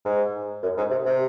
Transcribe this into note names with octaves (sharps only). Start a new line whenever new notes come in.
G#2
F#2
G#2
C3
C3